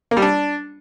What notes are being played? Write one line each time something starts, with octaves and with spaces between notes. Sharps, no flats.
A#3
G3
D4